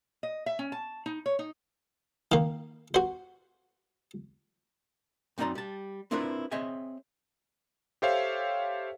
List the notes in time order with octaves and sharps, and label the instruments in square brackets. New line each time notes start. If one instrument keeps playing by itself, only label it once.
[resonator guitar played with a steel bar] D#5
E5
C#4
A5
D#4
C#5
D#4
[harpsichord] D#3 A#3
F#4 C5
[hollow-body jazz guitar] F#2 C4 D#4 D5 A#5 C6
G3 A5
C4 D4 E4 F4 A#4 B4
C4 G#4 C#5 D#5 E5 G#5
[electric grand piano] G4 A4 C5 C#5 E5 F5